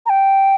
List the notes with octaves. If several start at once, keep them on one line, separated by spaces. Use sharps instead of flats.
A#5
G5